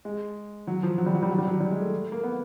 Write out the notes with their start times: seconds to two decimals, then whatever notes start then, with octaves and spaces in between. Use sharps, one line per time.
0.05 G#3
0.67 F#3
0.83 F3
0.98 F#3
1.06 G3
1.15 F#3
1.23 G3
1.30 F#3
1.39 G3
1.47 F#3
1.60 G3
1.71 G#3
1.82 A3
2.12 A#3
2.23 B3